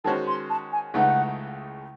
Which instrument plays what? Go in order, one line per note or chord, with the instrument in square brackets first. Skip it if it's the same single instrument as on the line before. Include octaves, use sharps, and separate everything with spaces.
[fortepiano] D#3 G#3 C#4 F#4 C5 [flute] A5
[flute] C6
A5
G#5
[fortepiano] C#2 C#3 E3 A3 D#4 [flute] F#5